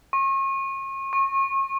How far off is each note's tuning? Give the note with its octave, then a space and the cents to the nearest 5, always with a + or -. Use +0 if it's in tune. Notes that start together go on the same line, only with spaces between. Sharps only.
C#6 -40
C#6 -30